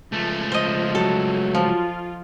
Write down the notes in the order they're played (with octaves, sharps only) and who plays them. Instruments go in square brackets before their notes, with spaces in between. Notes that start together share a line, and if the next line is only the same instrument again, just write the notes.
[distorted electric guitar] C#2 A3 [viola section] F3
[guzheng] C5 D#5
[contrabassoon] F#3 [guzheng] A4
[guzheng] F3 [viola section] F4